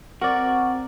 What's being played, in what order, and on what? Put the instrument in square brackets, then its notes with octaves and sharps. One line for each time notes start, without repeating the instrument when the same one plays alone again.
[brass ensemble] C4 [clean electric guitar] F#4 [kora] A#4 D5